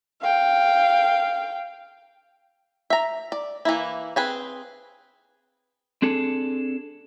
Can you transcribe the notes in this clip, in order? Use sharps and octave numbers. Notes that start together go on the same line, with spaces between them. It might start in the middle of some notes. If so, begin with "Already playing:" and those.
F5 G5
E5 A#5
D5
E3 A#3 E4
C4 G#4 B4
C4 D4 G#4 A4